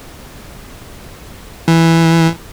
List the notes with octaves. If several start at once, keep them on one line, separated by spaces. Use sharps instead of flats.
E3